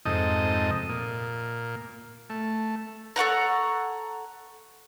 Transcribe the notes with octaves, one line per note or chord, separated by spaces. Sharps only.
F2 G#2 C3 D#4 A4 D#5
A#2
A3
A4 C#5 F#5 A#5